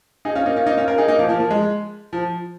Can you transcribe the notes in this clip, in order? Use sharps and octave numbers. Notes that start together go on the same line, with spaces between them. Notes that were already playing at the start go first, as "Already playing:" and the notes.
D#4 G#4
C#4 F4
A#3 D#4
C#4 F4
A#3 D#4
C#4 F4
F4 A#4
D#4 G#4
A#3 D#4
F3 A#3
F3 A#3
F3
G#3
F3